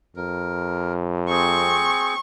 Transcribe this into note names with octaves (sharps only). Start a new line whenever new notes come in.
F2 A#4
C4 G#4 C#6